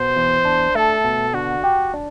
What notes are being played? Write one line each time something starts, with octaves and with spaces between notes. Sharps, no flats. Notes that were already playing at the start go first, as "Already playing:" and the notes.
Already playing: B2 C5
E2
D4
A3 A4
B2
D3 F#4
G4
D4